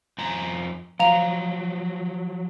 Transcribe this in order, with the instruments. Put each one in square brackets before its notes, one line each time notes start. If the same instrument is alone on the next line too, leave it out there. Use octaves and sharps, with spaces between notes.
[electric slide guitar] F2 G#5 A#5
[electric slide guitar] F3 F#3 [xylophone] F5 A#5 F7